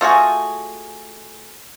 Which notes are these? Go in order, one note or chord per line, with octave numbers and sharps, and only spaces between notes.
A3 F4 F#4 G#4